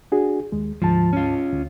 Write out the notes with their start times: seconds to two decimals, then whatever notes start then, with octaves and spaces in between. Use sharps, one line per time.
0.12 D4 F#4 G#4
0.52 D#2 G#3
0.82 D2 G#2 F3 A5
1.13 C#4 F4
1.52 D2